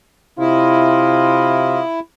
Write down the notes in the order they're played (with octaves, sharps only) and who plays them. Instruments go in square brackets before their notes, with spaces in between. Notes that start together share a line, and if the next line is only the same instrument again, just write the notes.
[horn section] C3 F4 D#5 [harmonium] E4